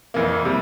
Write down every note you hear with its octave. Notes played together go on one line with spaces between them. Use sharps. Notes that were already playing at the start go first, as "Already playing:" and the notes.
F2 E3 A#3
C3 G3